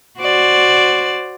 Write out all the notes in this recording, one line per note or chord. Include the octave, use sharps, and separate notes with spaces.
F#4 C5 D5